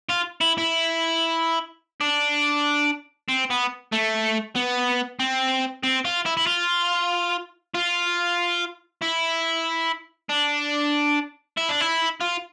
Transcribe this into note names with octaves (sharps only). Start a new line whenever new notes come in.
F4
E4
E4
D4
C4
B3
A3
B3
C4
C4
F4
E4
E4
F4
F4
E4
D4
E4
D4
E4
F4